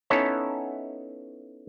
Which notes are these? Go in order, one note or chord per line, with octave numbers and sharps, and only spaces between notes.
B3 C#4 D#4 E4 A4 C#5